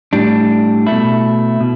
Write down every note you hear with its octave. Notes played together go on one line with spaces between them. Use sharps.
A2 G3 D4
B2 A3 E4
B2